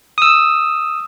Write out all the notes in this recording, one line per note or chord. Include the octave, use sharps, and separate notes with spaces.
D#6 E6